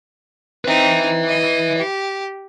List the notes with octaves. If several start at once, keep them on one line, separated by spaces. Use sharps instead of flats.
C4 D#4 B4 E5
D#5
G4